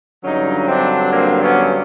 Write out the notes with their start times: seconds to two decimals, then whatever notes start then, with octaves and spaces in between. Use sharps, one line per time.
0.24 G2 D3 F#3 C#4 D#4
0.68 C4 D4
1.13 A#3 C4
1.42 B3 C#4